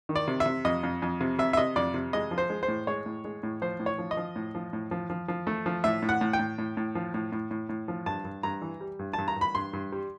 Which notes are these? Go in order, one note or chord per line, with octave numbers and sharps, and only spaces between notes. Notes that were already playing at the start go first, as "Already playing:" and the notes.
D#3
D5
C3
E5
C3
F2 D#5
F2
F2
C3
C3 E5
E5
C3 D#5
F2 D5
C3
G#3 D#5
F3
C5
G#3
C5
A2
G#3 C#5
A2
G#3
A2
F3 C5
A2
C#5
F3
D#5
F3
A2
F3
A2
F3
F3
F3
A3
F3
A2 E5
A2
F#5
A2
G5
A2
A2
A2
F3
A2
A2
A2
A2
F3
G2 A5
G2
G2 A#5
E3
G3
G2
G2 A5
A#5
G2 B5
G2 C6
G2
G3